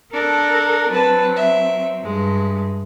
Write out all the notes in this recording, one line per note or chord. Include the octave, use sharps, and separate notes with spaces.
D4 A4 A#4
F#3 C4 B4 A5
E5
G2 G#3